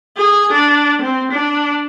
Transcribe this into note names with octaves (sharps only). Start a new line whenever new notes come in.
G#4
D4
C4
D4